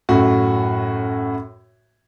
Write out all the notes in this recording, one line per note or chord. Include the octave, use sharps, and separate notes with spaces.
F#2 A2 F#4